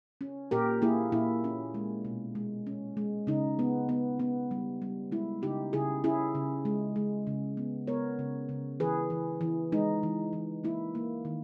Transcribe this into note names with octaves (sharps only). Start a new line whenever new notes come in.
C#4
A#2 G4 A#4
A#3 E4 G#4
A#2 E4
C#4
G#3
B2
G#3
C#4
G#3
C#3 D#4
B3
B3
B3
G3
G3
G#3 E4
C#3 D#4 G4
C#3 E4 G#4
C#4 E4 G#4
C#3
G#3
G#3
C#3
B3
B3 A#4 C#5
C#3
C#3
E3 G#4 B4
E3
E3
G#3 D#4
E3
E3
A#3 E4
A#3
D#3